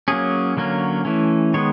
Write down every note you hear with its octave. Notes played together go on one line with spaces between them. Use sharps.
F#3 A#3 C#4 G#4
D3 F#3 A#3 C#4
E3 A3 C#4
D#3 G#3 B3 C#5